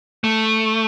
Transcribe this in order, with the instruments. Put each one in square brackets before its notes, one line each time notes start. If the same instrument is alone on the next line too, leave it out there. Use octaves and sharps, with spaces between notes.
[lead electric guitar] A3